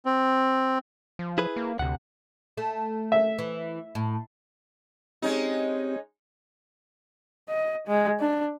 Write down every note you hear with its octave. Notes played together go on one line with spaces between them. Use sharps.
C4
F3
E4 G#4 B4
A#3
D2 C3 F#5
A3
E5
E3
A2
G#3 C4 C#4 D#4 G4
D#5
G#3
D4